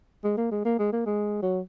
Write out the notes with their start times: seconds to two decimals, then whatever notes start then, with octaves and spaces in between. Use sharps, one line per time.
0.24 G#3
0.38 A#3
0.51 G#3
0.65 A#3
0.79 G#3
0.93 A#3
1.06 G#3
1.42 F#3